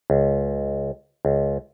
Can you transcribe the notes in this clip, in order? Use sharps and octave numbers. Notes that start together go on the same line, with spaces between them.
C#2
C#2